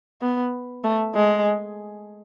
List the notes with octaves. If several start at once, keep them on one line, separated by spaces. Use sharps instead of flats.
B3
A3
G#3